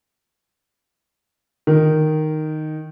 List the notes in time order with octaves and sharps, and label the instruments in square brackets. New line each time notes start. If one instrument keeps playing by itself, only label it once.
[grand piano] D#3